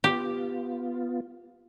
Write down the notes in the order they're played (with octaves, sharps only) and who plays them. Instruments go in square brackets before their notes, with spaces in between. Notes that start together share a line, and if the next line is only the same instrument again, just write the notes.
[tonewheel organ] B3 F4 [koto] G4